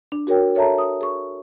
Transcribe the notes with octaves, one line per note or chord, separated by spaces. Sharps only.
D4
F#4 G#4 A#4 C#5 G5
A4 C#5 E5 A5 A#5
D#6
G#4 C#6